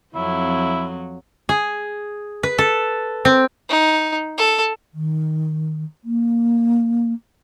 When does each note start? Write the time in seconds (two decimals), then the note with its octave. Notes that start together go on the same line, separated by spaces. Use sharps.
0.15 F2 F#3 C4 E4
1.49 G#4
2.43 B4
2.58 A4
3.25 C4
3.69 D#4
4.38 A4
4.94 D#3
6.04 A#3